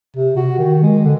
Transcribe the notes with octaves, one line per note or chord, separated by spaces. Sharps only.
C3
F#4
D#3
G#3
D3